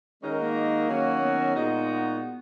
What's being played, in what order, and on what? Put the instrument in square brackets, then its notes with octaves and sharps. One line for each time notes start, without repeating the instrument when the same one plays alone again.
[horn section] D#3 G#3 D#4 F#4 A#4 [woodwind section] C#4
[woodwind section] A#3
[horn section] D#3 F#3 C#4 F#4
[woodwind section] B3
[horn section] A#2 G#3 D#4 F#4